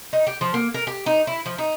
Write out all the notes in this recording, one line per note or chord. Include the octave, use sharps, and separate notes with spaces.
D#4
G4
F3
A#3
A#4
G4
D#4
E4
F3
D#4